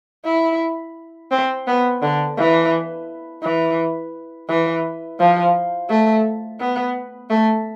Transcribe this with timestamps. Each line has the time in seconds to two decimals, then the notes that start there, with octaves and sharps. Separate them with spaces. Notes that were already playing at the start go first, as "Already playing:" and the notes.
0.25 E4
1.31 C4
1.67 B3
2.02 D3
2.37 E3
3.43 E3
4.49 E3
5.20 F3
5.90 A3
6.60 B3
7.30 A3